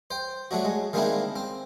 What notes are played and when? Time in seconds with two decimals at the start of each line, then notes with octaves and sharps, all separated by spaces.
0.11 C5 G5
0.51 F#3 A3 D4 F#4
0.65 G#3
0.93 D#3 G#3 A#3 C4 D4 E4
1.36 C4